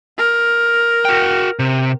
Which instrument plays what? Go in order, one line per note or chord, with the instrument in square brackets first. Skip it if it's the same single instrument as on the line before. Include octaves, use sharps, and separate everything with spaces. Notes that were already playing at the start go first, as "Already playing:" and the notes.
[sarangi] A#4
[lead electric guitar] F#4 G5
C3